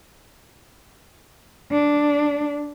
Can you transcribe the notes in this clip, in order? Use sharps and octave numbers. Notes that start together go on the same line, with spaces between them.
D4